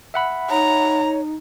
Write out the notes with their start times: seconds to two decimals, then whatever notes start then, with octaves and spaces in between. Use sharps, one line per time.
0.14 E5 F#5 B5
0.50 D#4 C#5 A#5